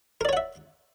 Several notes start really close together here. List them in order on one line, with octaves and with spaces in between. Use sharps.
A#4 D5 C#5 F#5 E5